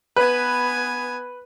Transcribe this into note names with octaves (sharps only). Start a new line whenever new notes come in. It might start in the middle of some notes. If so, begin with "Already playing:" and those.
B3 B4 G#5